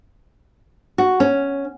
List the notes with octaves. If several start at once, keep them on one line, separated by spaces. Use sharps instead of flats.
F#4
C#4